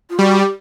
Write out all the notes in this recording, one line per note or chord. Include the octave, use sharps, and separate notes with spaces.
F4
G3 F#4
G4